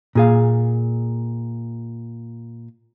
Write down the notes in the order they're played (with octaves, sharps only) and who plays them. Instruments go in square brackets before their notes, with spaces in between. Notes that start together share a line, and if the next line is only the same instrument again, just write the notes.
[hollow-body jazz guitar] A#2 G#4 F5